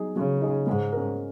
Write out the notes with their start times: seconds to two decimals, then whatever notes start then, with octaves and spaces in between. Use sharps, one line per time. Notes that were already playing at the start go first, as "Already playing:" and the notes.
Already playing: F#3 D#4 G#4
0.16 C#3 F#3
0.41 D#4 G#4
0.66 G#2 G#3
0.92 C#4 A#4